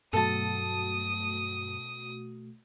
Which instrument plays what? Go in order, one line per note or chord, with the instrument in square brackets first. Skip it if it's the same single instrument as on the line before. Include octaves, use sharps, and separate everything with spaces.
[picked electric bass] G2 F#3 [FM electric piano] B2 A3 F#4 [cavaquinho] A4 A5 [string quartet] D#6